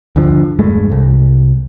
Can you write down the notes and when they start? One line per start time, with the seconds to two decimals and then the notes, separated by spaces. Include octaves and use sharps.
0.16 D2 G2 D3 F3
0.59 E1 G2 G#3 A3
0.92 C2